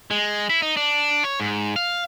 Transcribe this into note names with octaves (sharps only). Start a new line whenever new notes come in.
G#3
E4
D#4
D4
C#5
G#2
F5